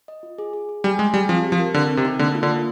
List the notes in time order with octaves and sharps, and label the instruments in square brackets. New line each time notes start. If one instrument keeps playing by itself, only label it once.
[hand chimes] D#5
F4
G#4
G#4
G#4
[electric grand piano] G3 [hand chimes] G#5
[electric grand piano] G#3 [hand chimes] G#5
[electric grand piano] G3 [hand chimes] G#4
[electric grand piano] F3 [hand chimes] C4
[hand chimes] G4
[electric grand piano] F3
[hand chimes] A#4
[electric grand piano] D3 [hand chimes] C4
[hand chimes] C4
[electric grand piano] C3
[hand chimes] D#4
[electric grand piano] D3 [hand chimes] A#3
[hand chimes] F4
[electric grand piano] D3
[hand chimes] A#3